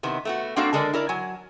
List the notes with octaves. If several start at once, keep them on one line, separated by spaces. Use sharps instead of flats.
C3 D#3 B3 E4
A3 B3 F#4
A#3 C4 D4 F#4 A4 F5
D3 G#3 A4 A#4 D5
E4 A#4 D5
F#3 G#5